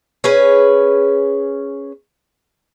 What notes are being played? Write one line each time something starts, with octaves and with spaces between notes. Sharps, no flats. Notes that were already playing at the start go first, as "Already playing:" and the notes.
C#4 G#4 B4